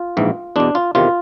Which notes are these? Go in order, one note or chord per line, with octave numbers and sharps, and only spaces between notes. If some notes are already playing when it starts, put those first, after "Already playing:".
Already playing: F4
A#1 G#2 E3
E2 B2 D4
F4
E2 C3 D#3 F4